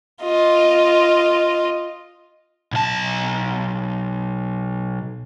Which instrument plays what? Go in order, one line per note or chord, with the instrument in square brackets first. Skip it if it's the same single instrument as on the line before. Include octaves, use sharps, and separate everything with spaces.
[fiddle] F4 D#5
[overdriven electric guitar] B1 A5